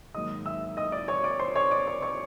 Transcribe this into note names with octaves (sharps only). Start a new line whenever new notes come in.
G#2 D#3 F#3 A#3 D#4 D#5 D#6
E5 E6
D#5 D#6
D5 D6
C#5 C#6
D5 D6
C5 C6
C#5 C#6
D5 D6
C#5 C#6
C#5 C#6